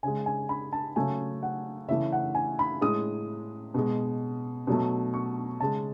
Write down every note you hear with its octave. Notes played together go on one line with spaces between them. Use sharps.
C#3 G#3 G#5
G#5
B5
A5
C#3 F#3 A3 G#5
F#5
C#3 E3 A3 E5
F#5
G#5
B5
A2 G#3 D#6
B2 G#3
B2 F#3 A3
C#6
C#3 G#3 A5